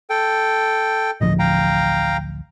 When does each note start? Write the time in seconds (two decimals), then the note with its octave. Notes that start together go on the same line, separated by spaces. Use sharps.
0.10 A4 G5
1.21 A1 D2 F3 D#5
1.39 F5 G5 A#5